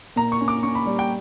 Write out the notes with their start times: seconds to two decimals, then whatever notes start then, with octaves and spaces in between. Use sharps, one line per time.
0.16 A#2 A#5
0.32 C#6
0.41 C#4
0.48 D6
0.63 C#4 C#6
0.75 B5
0.86 G3
0.99 G5